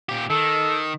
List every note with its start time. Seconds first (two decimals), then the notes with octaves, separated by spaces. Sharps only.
0.09 A#2 G4
0.30 D#3 A4